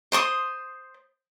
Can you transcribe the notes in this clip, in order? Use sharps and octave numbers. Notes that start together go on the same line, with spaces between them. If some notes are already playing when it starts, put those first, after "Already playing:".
C5 C6 C#6 D#6